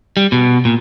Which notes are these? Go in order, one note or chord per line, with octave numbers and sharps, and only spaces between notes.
G3
B2
A#2